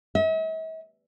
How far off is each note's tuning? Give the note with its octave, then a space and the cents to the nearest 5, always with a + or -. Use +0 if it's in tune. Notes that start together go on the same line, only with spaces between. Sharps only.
E5 -45